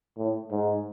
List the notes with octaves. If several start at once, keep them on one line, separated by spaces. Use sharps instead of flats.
A2
G#2